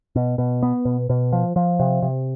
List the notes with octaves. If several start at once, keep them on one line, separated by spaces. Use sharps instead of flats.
B2
B2
B3
B2
B2
F3
F3
C3
C3